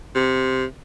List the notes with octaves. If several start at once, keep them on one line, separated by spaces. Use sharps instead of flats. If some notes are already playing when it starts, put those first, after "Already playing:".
C3